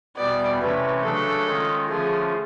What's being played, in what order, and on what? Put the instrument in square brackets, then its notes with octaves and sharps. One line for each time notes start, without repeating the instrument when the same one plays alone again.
[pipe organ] E2 B2 G3 B3 [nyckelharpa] D5
[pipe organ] C3 E3 A3 C#4 [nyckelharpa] B4
[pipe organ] C#3 F#3 A3 D4 [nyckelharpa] A4
[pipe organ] D#3 G#3 C#4 F4
[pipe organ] D3 F3 A3 C#4 F4 [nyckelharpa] G#4